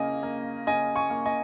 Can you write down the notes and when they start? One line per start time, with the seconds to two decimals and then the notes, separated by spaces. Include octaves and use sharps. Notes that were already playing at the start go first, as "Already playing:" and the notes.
Already playing: C#3 A#3 D#5 G#5
0.23 A#3
0.67 C#3 D#5 G#5
0.96 G#5 C#6
1.10 A#3
1.26 D#5 G#5